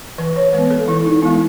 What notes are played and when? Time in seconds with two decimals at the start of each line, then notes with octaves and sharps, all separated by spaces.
0.18 E3 B4
0.36 C#5
0.53 G#3 B4
0.58 B3
0.71 A4
0.88 E3 E4
1.06 D#4
1.22 G#3 B3 E4